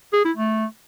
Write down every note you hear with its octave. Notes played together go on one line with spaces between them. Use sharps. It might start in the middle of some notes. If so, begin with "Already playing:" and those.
G#4
E4
A3